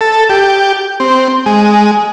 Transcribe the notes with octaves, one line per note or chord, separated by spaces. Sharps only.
A4
G4
C4
G#3